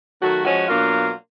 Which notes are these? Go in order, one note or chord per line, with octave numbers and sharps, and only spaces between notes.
D#3 F#3 A3 F#4
F3 G#3 C#4 F#4
B2 F#3 A#3 D4 F4